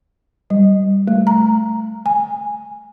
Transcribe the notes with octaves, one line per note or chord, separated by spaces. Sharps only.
G3
A3
A#5
G#5